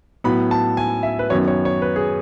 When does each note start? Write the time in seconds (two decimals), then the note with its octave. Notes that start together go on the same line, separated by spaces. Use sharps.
0.24 A2 F#3 B3 B5
0.51 A5
0.77 G#5
1.03 E5
1.19 B4
1.30 F#2 D#3 F#3 B3 C#5
1.48 C#5
1.65 C#5
1.82 B4
1.96 G#4